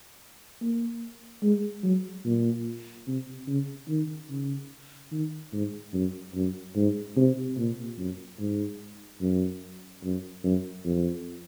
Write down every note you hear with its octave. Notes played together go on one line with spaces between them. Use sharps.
A#3
G#3
F#3
A#2
C3
C#3
D#3
C#3
D#3
G#2
F#2
F#2
G#2
C3
A#2
F#2
G#2
F#2
F#2
F#2
F2